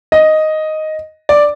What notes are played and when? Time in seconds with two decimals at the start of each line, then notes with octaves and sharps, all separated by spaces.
0.12 D#5
1.29 D5